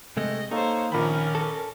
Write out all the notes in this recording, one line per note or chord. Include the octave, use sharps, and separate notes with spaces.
C3 G#3 A3 D#5
A#3 D#4 A4 C5 C#5
A#1 D#3 C#4 A#4 B5
A4